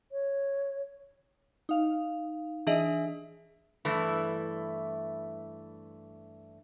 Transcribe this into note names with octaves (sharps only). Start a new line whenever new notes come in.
C#5
D#4 F5
E3 D4 G#4 D#5 E5
G2 E3 A3 E4